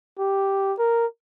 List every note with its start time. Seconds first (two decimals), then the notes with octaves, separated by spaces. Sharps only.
0.19 G4
0.79 A#4